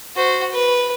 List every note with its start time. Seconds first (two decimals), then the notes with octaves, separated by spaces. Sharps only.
0.16 F#4 C5
0.52 B4